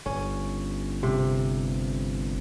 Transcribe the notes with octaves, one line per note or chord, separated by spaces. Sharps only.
G1 C#4
C3